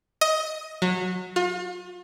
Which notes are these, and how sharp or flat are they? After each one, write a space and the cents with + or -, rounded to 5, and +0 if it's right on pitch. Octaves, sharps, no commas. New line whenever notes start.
D#5 +15
F#3 -20
F4 +40